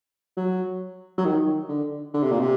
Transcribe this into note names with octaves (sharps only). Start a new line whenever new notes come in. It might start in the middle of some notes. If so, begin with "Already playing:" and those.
F#3
F#3
D#3
D3
D3
C3
A#2
C3